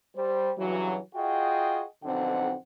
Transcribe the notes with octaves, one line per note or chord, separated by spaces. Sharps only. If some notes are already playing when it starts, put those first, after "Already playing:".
G3 C5
G2 C#3 E3 F#3
F4 F#4 G#4 D#5 G5
B1 F2 D3 C4 D#4 F#5